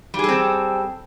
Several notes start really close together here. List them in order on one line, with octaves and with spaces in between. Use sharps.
G3 G#4 A4 C4